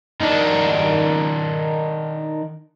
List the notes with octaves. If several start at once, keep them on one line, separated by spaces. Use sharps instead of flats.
D#3 D4